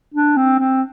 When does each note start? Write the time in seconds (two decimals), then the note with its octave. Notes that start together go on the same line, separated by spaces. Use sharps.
0.14 D4
0.37 C4
0.59 C4